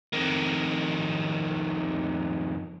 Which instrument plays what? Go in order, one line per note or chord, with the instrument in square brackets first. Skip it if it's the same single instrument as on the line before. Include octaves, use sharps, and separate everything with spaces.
[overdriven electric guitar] F2 D#3